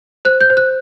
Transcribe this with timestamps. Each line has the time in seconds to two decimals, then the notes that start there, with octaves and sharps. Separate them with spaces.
0.25 C5 F#6
0.41 G6
0.50 C5
0.57 F#6